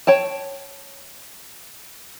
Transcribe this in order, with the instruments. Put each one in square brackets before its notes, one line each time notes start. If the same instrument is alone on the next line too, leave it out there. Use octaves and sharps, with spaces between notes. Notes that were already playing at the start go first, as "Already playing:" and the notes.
[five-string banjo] C#5 G5 A5